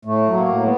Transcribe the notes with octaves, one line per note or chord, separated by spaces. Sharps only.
A2 A3
F#3
A#3
A2
A3 B3